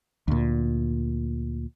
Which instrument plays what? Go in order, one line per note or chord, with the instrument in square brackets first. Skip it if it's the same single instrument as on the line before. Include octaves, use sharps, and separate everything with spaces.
[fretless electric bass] D2 A#2